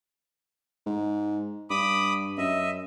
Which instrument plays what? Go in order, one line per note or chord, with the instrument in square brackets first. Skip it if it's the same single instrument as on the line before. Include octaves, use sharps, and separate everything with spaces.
[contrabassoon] G#2
[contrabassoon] G2 [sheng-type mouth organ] B5 D6 D#6
[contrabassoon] F#2 [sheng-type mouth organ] D#5 E5